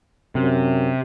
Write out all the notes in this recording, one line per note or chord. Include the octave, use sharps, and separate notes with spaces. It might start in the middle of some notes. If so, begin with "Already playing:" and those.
F#2 C3